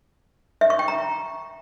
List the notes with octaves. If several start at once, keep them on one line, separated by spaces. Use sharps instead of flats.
E5
C#6
G5
A#5